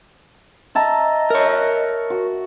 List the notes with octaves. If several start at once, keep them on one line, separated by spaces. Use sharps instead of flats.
D#5 E5 A5 A#5
A#4 C#5
F#4